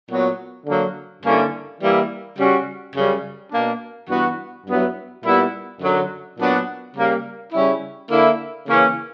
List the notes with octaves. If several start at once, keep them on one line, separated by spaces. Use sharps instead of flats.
A#2 F#3 B3 F#4
D3 F#3 A#3
G2 D3 A#3 C#4 E4
E3 G3 A#3 E4
C#3 G3 C#4 F#4
F#2 C#3 G3 C#4
B2 A#3 D4
G2 E3 B3 F#4
G2 F#3 B3 E4
A#2 G3 B3 E4
F#2 D3 F#3
A#2 F#3 B3 D4 F#4
C#3 G3 A#3
C#3 G3 C#4 E4
D3 A#3 E4
C#3 E3 A#3 C#4